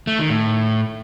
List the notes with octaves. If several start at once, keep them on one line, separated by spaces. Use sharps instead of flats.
A3
D#3
A2